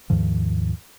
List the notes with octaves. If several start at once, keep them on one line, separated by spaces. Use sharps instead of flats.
D#2 G#2 D#3 F3